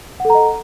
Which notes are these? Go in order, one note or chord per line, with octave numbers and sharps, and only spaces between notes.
A4 D#5 F#5 A#5